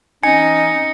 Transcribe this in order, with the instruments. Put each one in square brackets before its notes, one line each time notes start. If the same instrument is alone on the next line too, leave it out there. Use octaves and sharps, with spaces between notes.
[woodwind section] E3 C4 C#4 [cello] D#4 [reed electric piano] G#5 [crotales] C#7